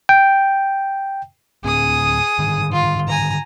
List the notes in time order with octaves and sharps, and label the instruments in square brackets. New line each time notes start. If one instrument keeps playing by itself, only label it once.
[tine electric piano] G5
[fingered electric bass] D2 A2 C4 [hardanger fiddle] G#4 D#6
[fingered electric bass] G#2 D3 D#3
[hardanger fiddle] F4
G#5 A#5